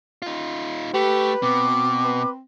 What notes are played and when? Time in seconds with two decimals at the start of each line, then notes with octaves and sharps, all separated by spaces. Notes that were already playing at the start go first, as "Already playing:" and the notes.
0.22 D#4 F4
0.94 A3 G4 B4
1.43 B2 C4 D6
2.04 B4